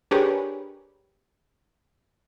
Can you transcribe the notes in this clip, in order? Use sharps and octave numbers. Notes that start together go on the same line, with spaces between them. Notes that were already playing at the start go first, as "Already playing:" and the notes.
D4 G4 G#4 A#4 B4 C#5